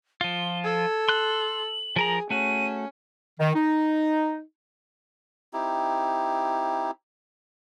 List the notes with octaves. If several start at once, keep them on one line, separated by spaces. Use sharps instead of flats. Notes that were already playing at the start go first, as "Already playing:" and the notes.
F3 F4 G7
A4 G#6
C6 F#6 F#7
F3 G#4 A#4 A#5
A3 C#4 F#4 D#7
D#3
D#4
C4 D#4 E4 G4